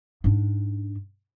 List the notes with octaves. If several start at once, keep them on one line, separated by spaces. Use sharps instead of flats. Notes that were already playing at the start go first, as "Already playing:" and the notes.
G#2 D4